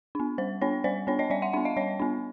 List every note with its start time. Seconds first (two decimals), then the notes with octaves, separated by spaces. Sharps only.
0.15 B3 D4
0.38 G3 C5
0.61 B3 D4 C#5
0.84 G3 C5 D5
1.07 B3 D4 C#5
1.19 C#5 D#5
1.30 G3 D5 E5
1.42 E5 F#5
1.53 B3 D4 E5 F#5
1.65 D#5 F5
1.77 G3 C#5 D#5
2.00 B3 D4